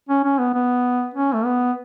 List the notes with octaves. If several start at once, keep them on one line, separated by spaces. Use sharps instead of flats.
C#4
C#4
B3
B3
C#4
A3
B3